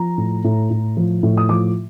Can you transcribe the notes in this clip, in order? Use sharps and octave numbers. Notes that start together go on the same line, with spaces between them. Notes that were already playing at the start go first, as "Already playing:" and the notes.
Already playing: F3 A#5
A2
A2
A2
F3
A2
D#6
F3 D6